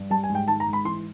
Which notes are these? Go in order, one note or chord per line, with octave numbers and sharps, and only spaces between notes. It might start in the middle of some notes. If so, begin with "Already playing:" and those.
Already playing: G2
G3 A5
G#5
G#2
G5
D#3 A5
A#5
G#2
B5
E3 C6